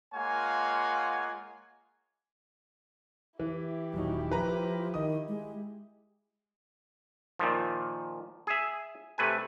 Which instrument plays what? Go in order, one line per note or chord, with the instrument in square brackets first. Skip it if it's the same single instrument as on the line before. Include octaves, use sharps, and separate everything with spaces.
[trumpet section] G#3 A#3 F4 C#5 F#5 G#5
[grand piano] E3 [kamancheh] E4 G4
[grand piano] D#1 D#4 [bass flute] F#3
[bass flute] F3 [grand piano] B4 A#5
[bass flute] D#3 [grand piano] D#5 D#6
[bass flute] G#3
[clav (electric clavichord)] A#2 D#3 F3
G#4 E5
C3 A3 B4 G#5